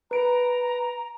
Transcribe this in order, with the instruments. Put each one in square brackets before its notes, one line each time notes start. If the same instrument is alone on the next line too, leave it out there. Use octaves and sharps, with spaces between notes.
[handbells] B4 D7 [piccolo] A#5